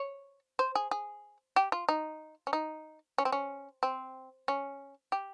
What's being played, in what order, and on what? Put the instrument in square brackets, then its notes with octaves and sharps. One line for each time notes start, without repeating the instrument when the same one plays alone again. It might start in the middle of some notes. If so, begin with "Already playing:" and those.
Already playing: [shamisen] C#5
C5
G#4
G#4
G4
F4
D#4
C#4
D#4
C#4
C4
C#4
C4
C#4
G4